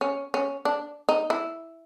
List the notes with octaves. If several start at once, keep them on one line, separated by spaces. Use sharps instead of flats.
C#4
C#4
D4
D#4
E4